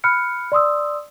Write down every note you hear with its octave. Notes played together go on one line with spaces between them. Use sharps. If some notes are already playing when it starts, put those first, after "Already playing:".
B5 F6 F#6 C#7
D5 C6 D#6 E6